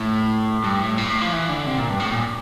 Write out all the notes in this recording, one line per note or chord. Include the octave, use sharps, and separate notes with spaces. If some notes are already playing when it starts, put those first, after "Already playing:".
Already playing: A2
G2
A2
A#2
A2
F3
E3
D3
C3
A#2
G2
A2
A#2